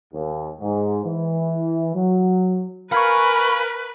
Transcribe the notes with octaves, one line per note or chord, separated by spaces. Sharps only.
D#2
G#2
E3
F#3
A#4 B4 F5 G#5 B5 C#6